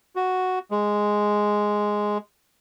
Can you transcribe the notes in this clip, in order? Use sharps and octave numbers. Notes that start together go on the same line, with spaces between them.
F#4
G#3